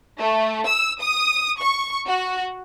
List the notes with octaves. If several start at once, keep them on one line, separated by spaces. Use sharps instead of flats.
A3
E6
D#6
C#6
F#4